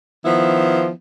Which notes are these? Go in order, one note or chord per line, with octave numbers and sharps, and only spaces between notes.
D#3 F3 B3 E4